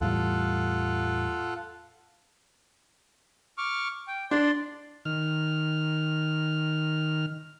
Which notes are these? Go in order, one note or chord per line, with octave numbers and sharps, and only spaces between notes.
E2 A2 G3 F4 A4 F#5
C#6 D6 F6
G5
D4 D5 C6
D#3 F6